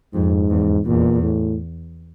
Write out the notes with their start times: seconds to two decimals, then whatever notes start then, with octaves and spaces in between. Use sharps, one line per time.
0.13 F2 G#2
0.50 E2
0.86 E2 A#2
1.23 A2